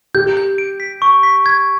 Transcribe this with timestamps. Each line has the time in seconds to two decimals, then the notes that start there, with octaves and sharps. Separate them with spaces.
0.14 G4 G6
0.37 G6
0.58 D7
0.80 B6
1.02 C#6
1.23 B6
1.46 G#6